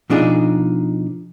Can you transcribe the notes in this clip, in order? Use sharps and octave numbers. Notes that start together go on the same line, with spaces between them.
B2 F3 D4 D#4 G#4